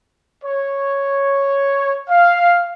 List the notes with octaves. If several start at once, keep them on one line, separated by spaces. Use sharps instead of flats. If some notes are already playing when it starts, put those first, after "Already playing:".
C#5
F5